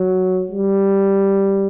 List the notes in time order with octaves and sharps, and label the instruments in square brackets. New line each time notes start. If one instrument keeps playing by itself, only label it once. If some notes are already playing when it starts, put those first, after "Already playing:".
Already playing: [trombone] F#3
G3